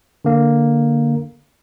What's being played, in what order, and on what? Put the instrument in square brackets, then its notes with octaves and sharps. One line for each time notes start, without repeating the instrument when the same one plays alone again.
[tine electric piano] D3 A#3